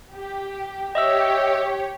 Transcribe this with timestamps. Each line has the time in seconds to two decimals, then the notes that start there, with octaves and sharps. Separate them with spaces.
0.14 G4
0.95 G4 C#5 D#5 E5 E6